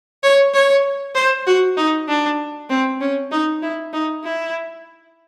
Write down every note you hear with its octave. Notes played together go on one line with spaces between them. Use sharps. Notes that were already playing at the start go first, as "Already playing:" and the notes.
C#5
C#5
C5
F#4
D#4
D4
C4
C#4
D#4
E4
D#4
E4